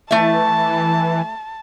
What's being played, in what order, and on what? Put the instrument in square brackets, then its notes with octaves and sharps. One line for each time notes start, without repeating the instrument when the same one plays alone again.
[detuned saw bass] E3 [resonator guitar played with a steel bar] A3 E5 [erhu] A5